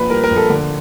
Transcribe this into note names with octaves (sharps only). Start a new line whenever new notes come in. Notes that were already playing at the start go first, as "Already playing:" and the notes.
Already playing: A#1 A#2 B4
G3 A#4
A#4
A#1
A4
D3